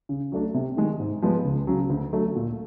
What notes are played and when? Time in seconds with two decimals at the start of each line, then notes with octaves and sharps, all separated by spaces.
0.09 C#3
0.32 F#3 A3 D4
0.54 C3
0.77 D#3 G#3
0.99 G#2
1.22 F3 G#3 B3
1.45 C#2
1.67 C#3 F#3
1.90 D2
2.13 D3 F#3 A3
2.35 A#2